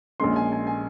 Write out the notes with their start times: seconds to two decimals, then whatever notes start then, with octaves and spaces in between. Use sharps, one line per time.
0.20 A#1 A#2 G#3 C#4 C6
0.36 G#5
0.52 G#5
0.67 G#5